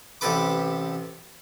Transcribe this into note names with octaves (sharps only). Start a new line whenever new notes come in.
A1 C3 G4 A4 B4 D6